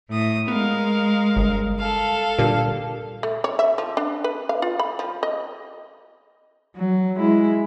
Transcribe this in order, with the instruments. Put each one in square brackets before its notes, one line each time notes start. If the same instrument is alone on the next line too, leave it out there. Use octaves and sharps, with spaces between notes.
[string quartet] A2 D#6
[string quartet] G#3 A#4 F5 [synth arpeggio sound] B3
[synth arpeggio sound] G1
[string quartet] A4 F5
[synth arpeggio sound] A#2 D3 G3
[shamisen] A3
C#5
E5
F3
D4
B4
F5
F4
B5
F3
D#5
[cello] F#3
G#3 E4